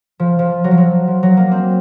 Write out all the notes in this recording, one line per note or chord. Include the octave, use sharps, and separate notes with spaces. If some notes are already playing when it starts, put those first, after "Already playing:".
F3
F3
F#3
F3
F#3
F3
F#3
A#3
C4